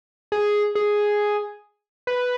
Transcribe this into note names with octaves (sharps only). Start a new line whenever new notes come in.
G#4
G#4
B4